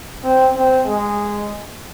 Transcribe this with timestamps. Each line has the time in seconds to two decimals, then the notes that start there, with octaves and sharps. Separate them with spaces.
0.23 C4
0.55 C4
0.86 G#3